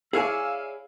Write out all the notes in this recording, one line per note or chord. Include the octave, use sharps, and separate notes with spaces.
E4 G#4 C#5 D5 F5 G#5 E6